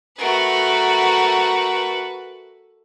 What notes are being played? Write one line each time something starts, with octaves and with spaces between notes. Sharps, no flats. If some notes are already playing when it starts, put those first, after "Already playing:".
A3 F#4 A#4 B4